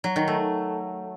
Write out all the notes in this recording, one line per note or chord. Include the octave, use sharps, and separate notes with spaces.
F#3
D#3
A3